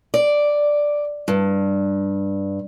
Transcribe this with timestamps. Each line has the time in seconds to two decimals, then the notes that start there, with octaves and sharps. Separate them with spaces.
0.14 D5
1.28 G2